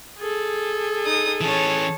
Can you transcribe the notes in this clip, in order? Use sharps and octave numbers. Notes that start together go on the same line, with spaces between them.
G#4 A4
D#4 D#6
E3 C#4 C#5 A5